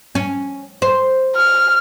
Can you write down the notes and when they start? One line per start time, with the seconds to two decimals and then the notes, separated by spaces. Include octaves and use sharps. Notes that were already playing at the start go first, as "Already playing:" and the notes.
0.15 C#4
0.82 C5
1.36 F6